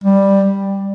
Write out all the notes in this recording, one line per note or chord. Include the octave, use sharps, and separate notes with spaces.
G3